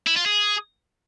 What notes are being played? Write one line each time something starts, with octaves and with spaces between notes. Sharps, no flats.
E4
F4
G#4